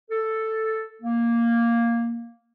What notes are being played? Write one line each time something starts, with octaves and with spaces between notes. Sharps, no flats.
A4
A#3